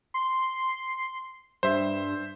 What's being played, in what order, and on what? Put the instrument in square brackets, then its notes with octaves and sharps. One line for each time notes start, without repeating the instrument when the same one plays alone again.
[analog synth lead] C6
[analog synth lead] G2 [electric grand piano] C5 E5